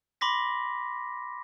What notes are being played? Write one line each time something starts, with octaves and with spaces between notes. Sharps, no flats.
B5 C6 D6 A#6 B6